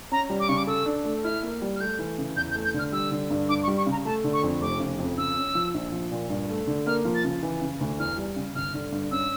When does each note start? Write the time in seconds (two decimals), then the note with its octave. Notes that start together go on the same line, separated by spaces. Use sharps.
0.11 C#4 A#5
0.30 G3
0.40 D6
0.48 C#3 C#6
0.57 D6
0.67 A4 E6
0.86 D4
1.05 A3
1.23 E4 F6
1.43 A#3
1.62 G3
1.76 F6
1.80 A3 G6
1.99 E3
2.18 C#3
2.36 E2 G6
2.50 G6
2.55 A3
2.65 G6
2.74 D3 F6
2.92 G3 E6
3.11 D3
3.31 G2
3.49 D4 D6
3.63 C#6
3.68 G3
3.77 C#6
3.86 C#3 A#5
4.05 A3 A5
4.24 D3
4.33 C#6
4.43 F2
4.61 F1 D6
4.80 C#3
4.99 F2
5.17 C#3 E6
5.37 C#4
5.55 F3
5.74 A#1
5.92 F3
6.11 A#2
6.30 G2
6.49 A3
6.67 D3
6.86 A#3 F6
7.05 F3
7.15 A6
7.24 C#3
7.43 E3
7.61 C#3
7.81 D2
7.99 E2 F6
8.17 G3
8.36 C#3
8.55 G1 F6
8.74 D3
8.92 G2
9.11 C#4 E6